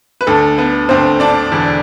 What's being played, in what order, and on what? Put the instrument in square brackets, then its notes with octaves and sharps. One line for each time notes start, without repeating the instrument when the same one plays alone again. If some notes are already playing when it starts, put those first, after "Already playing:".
[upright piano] B4
D2 D3 A4
B3 B4
D2 D3 C4 C5
D4 D5
E1 E2 D3